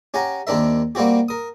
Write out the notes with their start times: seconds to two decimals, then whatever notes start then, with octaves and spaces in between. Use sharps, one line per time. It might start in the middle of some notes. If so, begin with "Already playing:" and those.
0.14 C#4 G4 F#5 G#5 A#5
0.47 D#2 C4 D4 A#4 E5
0.95 G3 A#3 C4 F#4 G4
1.29 A#4 D#6